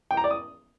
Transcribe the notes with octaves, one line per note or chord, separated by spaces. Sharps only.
G5
A#5
D5
D#6